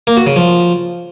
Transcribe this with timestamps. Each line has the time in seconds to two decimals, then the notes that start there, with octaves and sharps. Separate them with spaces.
0.07 A#3
0.17 F#4
0.27 C#3
0.36 F3